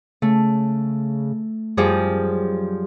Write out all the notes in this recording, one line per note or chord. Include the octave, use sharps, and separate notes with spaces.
C#3 A3
F#2 F3 G3 G#4